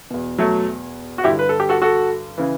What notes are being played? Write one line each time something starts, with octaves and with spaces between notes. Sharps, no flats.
E2 B2
F#3 A3
F#4
G2 D3 E4 G4
B4
A4
G4
F#4 A4
F#4 A4
C#3 E3